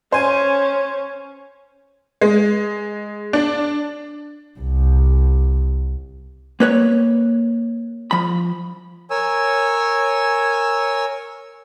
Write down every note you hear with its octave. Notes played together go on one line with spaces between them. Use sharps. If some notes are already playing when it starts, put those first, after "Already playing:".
C#4 C5 G#5
G#3
D4
C2
A#3 B4 C#5
F3 B5
A#4 C#5 G#5 E6